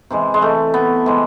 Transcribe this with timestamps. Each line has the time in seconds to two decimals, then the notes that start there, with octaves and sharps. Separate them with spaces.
0.11 C3 E3 G#3
0.34 G#3
0.42 A3
0.74 B3
1.06 C3 E3 G#3